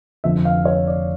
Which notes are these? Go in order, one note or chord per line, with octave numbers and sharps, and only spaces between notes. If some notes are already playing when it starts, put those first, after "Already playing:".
F1 F2 D3 F3 E5
F5
C#5
D5